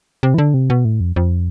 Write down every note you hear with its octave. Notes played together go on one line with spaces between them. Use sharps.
C3
E3
D3
C3
B2
A2
F2
F2